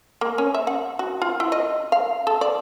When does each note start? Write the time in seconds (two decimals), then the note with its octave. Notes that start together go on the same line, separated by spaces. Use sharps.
0.21 A#3
0.38 C#4
0.54 E5
0.67 F#5
0.99 F#4
1.22 F4
1.40 E4
1.52 D#5
1.92 F5
2.27 A4
2.41 D5